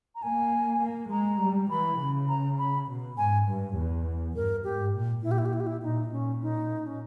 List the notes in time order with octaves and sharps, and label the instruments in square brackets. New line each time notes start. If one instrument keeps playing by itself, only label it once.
[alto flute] A#5
[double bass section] A#3 [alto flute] G#5
[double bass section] A#3
[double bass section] G#3 [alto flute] A#5
[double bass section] G3
[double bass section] E3 [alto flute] B5
[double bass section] C#3
[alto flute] A#5
B5
[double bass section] B2
[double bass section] G#2 [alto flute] G#5
[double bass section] G2
E2
[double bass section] G2 [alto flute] A#4
[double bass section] G#2 [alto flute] G4
[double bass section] A#2
[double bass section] A#2 [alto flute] E4
[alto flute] G4
E4
G4
E4
G4
E4
[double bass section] A#2 [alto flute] D#4
[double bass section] A#2 [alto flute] C#4
[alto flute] D#4
C#4